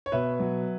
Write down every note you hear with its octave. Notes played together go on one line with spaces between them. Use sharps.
C#5
B2 B4 E5
F#3